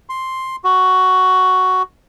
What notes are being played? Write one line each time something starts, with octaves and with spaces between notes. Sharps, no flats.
C6
F#4